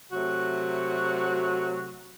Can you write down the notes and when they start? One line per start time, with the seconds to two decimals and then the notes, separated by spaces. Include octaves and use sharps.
0.12 C3 F#3 A3 F#4